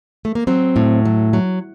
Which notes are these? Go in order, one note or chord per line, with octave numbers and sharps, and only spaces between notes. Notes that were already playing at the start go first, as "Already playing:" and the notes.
A3
A#3
F#3 C4
A2
F#3
F#3